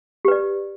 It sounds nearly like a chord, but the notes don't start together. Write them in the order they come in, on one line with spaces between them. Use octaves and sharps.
G4 B4 D5